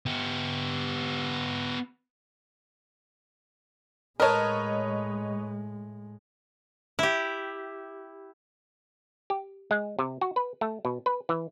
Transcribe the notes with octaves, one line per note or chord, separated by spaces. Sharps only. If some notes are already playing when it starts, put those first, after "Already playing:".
B3 G4
A2 G#3 A#4 B4 C#5 D#5 A5
E4 G4
G4
G#3
C3
F#4
B4
A3
B2
B4
E3